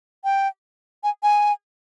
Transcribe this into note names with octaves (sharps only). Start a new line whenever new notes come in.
G5
G#5
G#5